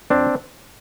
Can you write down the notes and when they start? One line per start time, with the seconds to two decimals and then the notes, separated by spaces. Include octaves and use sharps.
0.10 F2 C4 D4